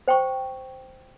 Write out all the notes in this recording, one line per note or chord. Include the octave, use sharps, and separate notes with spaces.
C5 G5 C#6